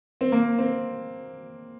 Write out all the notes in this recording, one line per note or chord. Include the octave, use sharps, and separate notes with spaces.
C4
A#3
C4